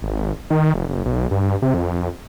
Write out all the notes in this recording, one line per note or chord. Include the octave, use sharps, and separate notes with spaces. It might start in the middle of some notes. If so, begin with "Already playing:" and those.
G#1
D#3
F1
F#1
B1
G2
C3
F2